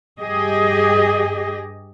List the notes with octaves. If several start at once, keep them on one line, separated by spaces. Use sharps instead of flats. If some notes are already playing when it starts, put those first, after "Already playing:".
G2 G4 G#4 D#5